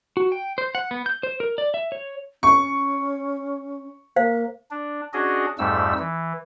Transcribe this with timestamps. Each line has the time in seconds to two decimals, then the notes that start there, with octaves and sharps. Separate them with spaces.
0.17 F#4
0.32 G5
0.58 C5
0.75 F#5
0.91 B3
1.06 G6
1.23 C5
1.40 A#4
1.58 D5
1.74 E5
1.92 C#5
2.43 C#4 C#6
4.16 A#3 C5 F5
4.71 D4
5.13 C#4 D4 F#4 G#4 D#5
5.59 F2 G#2 G3 A3 E6
5.99 E3